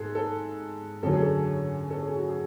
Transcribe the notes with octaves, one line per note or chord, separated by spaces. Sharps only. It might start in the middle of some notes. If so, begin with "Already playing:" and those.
Already playing: G#2 G#4 A4
A4
F#2 D3 F#3 A4
G#4
A4
A4
G#4
F#4
G#4